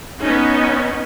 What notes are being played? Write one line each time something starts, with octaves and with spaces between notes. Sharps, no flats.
B3 C#4 D#4